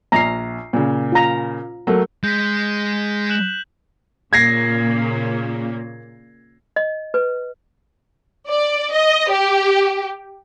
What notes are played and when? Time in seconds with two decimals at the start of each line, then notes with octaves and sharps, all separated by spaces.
0.12 A#1 A#5 C7
0.73 A#2 C#3
1.12 F4 A#5
1.87 F#3 A3 A#3
2.24 G#3 G6 B6
3.30 F#6 E7 F#7
4.33 A#2 C#3 A#3 G#6 A#6 C7
6.76 D#5
7.14 B4
8.49 D5
8.93 D#5
9.31 G4